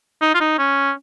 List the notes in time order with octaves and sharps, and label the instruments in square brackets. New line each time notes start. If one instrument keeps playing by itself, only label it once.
[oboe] D#4
F4
D#4
C#4